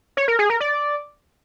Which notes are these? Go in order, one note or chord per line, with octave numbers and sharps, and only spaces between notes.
C#5
A#4
G#4
A#4
D5